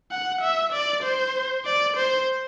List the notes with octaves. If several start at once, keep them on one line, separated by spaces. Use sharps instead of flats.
F#5
E5
D5
C5
D5
C5